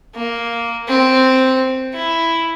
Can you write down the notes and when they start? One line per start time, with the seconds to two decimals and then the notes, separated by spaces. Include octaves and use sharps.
0.15 A#3
0.88 C4
1.94 E4